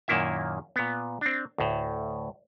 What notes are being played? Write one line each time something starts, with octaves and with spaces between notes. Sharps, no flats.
F#2 A#2 D#3 A#3 E4 E5
A#2 B3
C4 D4
D2 A2